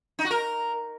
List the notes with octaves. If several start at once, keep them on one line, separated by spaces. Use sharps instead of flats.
D#4
F#4
A#4